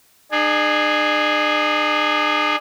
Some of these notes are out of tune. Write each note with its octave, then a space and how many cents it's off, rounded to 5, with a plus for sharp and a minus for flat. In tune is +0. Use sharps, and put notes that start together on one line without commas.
D4 +45 G#4 +0